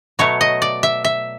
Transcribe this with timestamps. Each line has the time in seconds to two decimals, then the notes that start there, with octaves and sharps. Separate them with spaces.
0.19 B2 F#3 A3 C#5
0.41 D#5
0.62 D5
0.83 E5
1.04 E5